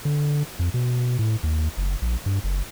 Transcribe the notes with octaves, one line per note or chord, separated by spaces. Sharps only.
D3
F2
B2
A2
D#2
F#1
A#1
G2
F#1